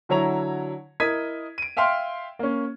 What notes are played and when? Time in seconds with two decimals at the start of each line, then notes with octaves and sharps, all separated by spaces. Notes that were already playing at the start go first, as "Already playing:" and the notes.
0.09 D3 F#3 E4 C#5 A#5 F7
1.00 E4 A#4 D#5 G#6 B6 D#7
1.58 D7 D#7
1.77 E5 F5 G5 C6 F6
2.39 A#3 C#4